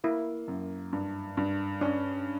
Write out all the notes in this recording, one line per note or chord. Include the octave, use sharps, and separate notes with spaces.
A#3 E4
F#2
G2
G2
C#4 D4